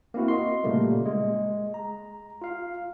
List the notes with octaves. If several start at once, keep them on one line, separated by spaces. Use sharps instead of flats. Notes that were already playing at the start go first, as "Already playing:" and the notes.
A#3 C4 E4 F#4
D#5 C6
A#2 C#3 G3 A3 A#3
G#3
A#5
F4 F5